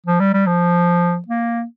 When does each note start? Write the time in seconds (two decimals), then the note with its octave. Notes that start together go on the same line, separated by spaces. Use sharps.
0.06 F3
0.20 G3
0.34 G3
0.46 F3
1.28 A#3